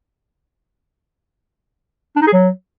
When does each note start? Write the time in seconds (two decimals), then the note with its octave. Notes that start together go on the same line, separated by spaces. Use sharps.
2.16 D4
2.22 D#4
2.27 G#4
2.33 F#3